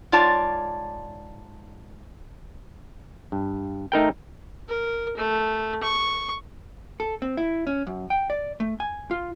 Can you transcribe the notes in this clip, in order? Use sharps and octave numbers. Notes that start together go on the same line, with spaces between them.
G#2 F4 C#5 D5 A5
G2
A3 D#4 A#4 G5
A#4
A3
C#6
A4
C4
E4
C#4
F#2
G5
D5
A3
G#5
F4